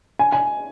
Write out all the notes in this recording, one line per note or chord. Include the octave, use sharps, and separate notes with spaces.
G#5
G#5